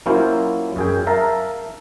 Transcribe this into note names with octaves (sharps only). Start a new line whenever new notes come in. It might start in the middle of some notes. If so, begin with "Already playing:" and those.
F#3 A#3 C#4 E4 F4 C5
F#2 G#4 G5
A#4 E5 F5 A5 A#5